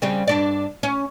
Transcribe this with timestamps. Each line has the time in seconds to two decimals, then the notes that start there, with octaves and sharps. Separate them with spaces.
0.02 C#3 G3 C4
0.27 G2 D4 D5
0.83 C#4